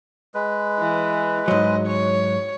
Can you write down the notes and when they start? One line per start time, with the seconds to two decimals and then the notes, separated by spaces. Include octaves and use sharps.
0.35 G#3 B4
0.79 E3
1.48 G#2 F#3 D#5
1.87 C#5